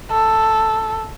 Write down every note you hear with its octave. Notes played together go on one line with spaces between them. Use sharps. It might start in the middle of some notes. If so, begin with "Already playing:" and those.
A4